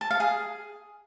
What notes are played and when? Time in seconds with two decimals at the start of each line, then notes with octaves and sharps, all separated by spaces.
0.01 A5
0.11 F5
0.20 G#4